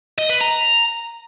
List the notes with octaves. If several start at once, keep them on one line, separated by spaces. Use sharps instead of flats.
D#5
B4
A#5